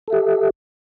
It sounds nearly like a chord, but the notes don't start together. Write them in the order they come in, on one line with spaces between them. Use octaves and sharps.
A4 E5 G4